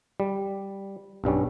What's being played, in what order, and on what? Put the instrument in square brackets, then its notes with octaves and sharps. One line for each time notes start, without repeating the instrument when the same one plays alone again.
[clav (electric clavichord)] G3
B1 G2 G3 C#4